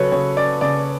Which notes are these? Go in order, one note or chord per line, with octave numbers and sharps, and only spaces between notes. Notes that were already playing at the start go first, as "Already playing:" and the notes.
Already playing: C#3 F#3 A4 B4 C#5
C#3 C#5
C#4 D5
C#3 D5